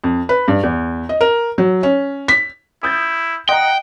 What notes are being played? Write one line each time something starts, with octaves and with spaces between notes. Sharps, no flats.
F2
B4
G2
E2
D#5
A#4
F#3
C#4
B6
E4 D#6 G6 A6
D#5 F#5 G5 A#5